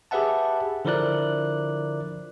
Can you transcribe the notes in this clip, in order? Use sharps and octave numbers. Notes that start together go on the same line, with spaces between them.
G4 G#4 B4 E5 F#5 A5
D3 F3 E4 A#4 D5 F#6